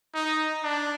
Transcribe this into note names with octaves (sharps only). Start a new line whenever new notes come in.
D#4
D4